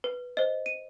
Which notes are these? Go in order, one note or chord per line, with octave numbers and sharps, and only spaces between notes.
B4
C5 D#5
D#7